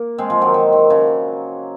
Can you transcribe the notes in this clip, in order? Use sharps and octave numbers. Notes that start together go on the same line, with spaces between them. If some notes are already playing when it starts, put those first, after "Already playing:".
Already playing: A#3
G#3 C4
F3 G#3
D#3 F#3
D#3
D#3
C#3